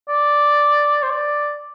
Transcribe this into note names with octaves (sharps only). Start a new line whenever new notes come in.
D5
C5
D5